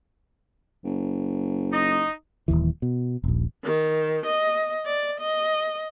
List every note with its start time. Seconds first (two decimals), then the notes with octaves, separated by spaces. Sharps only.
0.85 F#1
1.73 D#4 D#5
2.48 D#1 G#1 D#2 E3
2.82 B2
3.24 D#1 A#1
3.64 D#3
4.25 D#5
4.85 D5
5.20 D#5